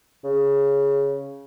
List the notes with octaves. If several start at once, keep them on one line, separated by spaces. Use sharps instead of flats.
C#3